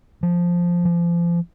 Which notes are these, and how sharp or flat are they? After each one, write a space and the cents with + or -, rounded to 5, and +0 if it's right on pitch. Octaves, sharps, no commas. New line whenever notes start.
F3 +0
F3 -30